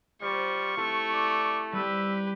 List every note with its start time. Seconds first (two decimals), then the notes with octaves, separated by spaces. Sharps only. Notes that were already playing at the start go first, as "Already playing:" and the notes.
0.22 G3 F4 C5 C#6 D6 A#6
0.77 A3 C4 E4 G4
1.13 D5
1.73 G3 C4 G4 B4 E6